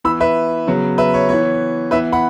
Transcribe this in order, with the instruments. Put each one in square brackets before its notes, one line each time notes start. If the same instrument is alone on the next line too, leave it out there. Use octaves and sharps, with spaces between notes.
[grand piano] E3 B3 B5 E6
B4 E5
C#3 F#3 B3
B4 E5
C#5
E3 B3 C#5
E3 B3 B4 E5
F#5 B5